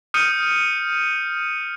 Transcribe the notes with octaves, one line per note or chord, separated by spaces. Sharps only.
D#6 F6 G6 C#7 D#7